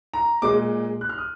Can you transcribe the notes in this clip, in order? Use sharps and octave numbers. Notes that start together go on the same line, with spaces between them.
A#5
A#2 G#3 D6
F#6
F6
D#6